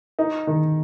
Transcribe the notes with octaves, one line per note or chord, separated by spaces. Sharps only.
D#4
D#3